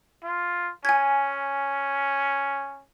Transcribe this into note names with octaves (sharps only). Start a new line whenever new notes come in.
F4
C#4 G#5 G#6